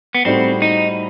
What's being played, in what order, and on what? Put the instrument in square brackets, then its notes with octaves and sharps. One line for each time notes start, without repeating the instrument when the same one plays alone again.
[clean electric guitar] B3
[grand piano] A2 G3 D#4 F#4 C5 [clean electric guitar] C4
[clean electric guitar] D#4